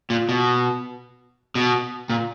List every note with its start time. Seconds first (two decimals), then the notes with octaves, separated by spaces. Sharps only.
0.10 A#2
0.29 B2
1.55 B2
2.10 A#2